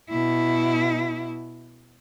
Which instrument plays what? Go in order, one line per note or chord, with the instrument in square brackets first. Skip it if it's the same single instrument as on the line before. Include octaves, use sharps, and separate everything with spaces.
[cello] B2 E4